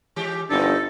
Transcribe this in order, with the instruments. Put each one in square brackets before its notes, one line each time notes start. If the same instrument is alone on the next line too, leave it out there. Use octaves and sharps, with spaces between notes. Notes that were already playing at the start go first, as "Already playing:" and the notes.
[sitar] E3 G#3 G4
[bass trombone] G1 [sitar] B3 C4 D#4 [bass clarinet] D4 [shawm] A4